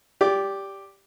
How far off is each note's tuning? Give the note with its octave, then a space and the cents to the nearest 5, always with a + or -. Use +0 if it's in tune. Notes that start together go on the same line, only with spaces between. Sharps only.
G4 +0 D5 -20